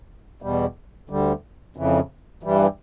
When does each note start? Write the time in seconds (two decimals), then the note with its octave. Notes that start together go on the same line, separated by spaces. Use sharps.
0.42 E2 B2 G3
1.10 D2 D3 G3
1.76 F2 C#3 E3
2.43 G2 E3 G3